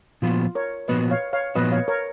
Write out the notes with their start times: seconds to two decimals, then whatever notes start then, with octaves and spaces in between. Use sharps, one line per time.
0.22 A#2 F3 B3 F4 F#4
0.55 A#4 C#5
0.88 A#2 F3 B3 F#4 B4 D#5
1.11 C#5 F5
1.33 C#5 F5
1.55 A#2 F3 B3 F#4 B4 D#5
1.72 C#5 F5
1.88 A#4 C#5